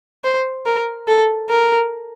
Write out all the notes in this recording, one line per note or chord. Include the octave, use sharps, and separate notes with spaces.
C5
A#4
A4
A#4